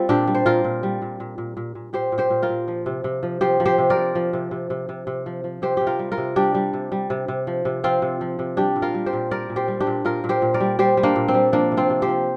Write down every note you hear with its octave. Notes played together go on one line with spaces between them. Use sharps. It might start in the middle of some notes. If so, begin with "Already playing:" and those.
Already playing: G3 C4 F4
A#2 D4 G4
G3
C5
A#2 F4 A#4
A#2
G3
A#2
A#2
A#2
A#2
A#2
A#2 G4 C5
A#2
G4 C5
A#2
F4 A#4
A#2
F3
C3
C3
F3
F3 G4 C5
F3
G4 C5
C3
A#4 D5
C3
F3
C3
C3
C3
C3
C3
F3
F3
C3 G4 C5
C3 G4
F4 A#4
G3
F4 A#4
C3
G3 D4 G4
G3
C3
G3
C3
C3
F3
C3
F3 C4 F4
C3
F3
C3
G3 D4 G4
A#2
F4 A#4
G3
G4 C5
A#2
G3 A#4 D5
A#2
G4 C5
G3
D4 G4
A#2
A#2 F4 A#4
A#2
G4 C5
A#2
A#4 D5
G3
G3 G4 C5
G3
A#3 D4
A#2
C4
G3
F3 A#3 D4
C3
C4 F4
C3
G4 C5
F3